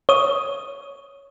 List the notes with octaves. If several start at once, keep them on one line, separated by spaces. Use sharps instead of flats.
C#5 D#6